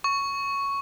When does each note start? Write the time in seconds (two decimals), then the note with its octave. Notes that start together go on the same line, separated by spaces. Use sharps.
0.04 C#6